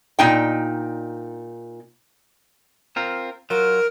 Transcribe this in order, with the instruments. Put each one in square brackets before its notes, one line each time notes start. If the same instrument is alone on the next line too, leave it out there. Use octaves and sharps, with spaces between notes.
[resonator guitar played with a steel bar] A#2 D#4 G5
[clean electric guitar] C4 F4 A#4
[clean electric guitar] F#3 F4 [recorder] A#4